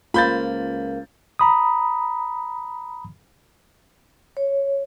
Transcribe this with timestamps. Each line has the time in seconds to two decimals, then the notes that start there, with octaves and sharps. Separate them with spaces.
0.14 C#2 A#3 F4 A#4 C5 B5 G6 A6
1.39 A#5 B5 D#6
4.37 C#5